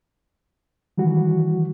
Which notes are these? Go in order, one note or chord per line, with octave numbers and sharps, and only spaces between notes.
D#3 E3 G3 F#4